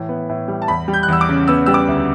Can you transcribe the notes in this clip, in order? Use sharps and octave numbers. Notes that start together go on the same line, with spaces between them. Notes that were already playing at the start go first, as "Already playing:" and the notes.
Already playing: A2 E3
B3
A2
G3
A5
E2 B5
G3
G6
F#6
E2 E6
D6
C#3
B3 E6
G3 E6
D6
D2